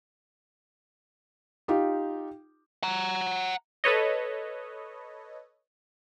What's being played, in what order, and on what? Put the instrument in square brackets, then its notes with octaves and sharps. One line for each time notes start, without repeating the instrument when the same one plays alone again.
[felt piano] D#4 F4 G4
[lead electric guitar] F#5 A#5
[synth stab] A4 B4 C#5 D#5